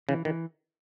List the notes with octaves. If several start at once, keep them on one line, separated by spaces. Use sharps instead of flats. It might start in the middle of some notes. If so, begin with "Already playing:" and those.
C#3 E3
D#3 E3